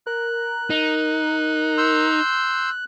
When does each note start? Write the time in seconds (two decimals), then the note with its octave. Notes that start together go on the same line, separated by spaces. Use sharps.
0.07 A#4 F#6
0.70 D#4
1.78 C6 E6 G6